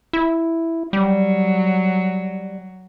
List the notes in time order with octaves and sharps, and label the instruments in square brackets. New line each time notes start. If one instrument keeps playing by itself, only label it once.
[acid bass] E4
[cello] F#3 [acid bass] G3